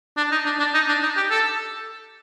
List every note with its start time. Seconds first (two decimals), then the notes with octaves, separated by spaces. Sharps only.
0.17 D4
0.32 D#4
0.45 D4
0.59 D4
0.74 D#4
0.89 D4
1.03 D#4
1.17 G4
1.30 A4